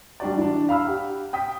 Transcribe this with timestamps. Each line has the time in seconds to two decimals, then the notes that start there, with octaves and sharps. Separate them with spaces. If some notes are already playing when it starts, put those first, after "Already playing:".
0.20 G3 D4 F#4 D5
0.37 E3 D4
0.69 F5 B5 E6 F6
0.87 G4 F#5
1.33 G5 D#6 B6